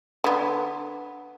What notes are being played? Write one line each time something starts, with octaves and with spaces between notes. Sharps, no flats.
D3 B3